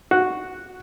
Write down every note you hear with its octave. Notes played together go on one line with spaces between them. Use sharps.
F#4